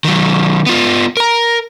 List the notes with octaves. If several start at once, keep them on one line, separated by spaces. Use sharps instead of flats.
D#3 F#3
B3 F4
A#4 A#5